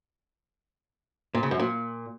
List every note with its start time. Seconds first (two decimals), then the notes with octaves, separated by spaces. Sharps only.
1.35 A#2
1.43 C#3
1.51 F#2
1.59 A#2